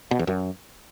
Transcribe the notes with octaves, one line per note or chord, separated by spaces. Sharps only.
B2
E2
F#2